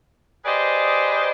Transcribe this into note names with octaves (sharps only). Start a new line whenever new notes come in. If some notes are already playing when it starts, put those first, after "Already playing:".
G4 G#4 B4 C5 D5 D#5